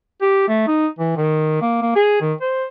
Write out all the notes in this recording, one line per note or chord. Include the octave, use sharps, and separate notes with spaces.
G4
A3
D#4
E3
D#3
A#3
A#3
G#4
D#3
C5